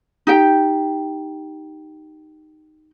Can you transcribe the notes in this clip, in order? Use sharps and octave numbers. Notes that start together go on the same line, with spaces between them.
D#4 G4 G5